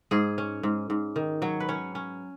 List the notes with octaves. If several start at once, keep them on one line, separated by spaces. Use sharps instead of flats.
G#2 G#4
C#4
G#2
G#2
D#3
F#3 C#5
B4
C#4 C#5
C#4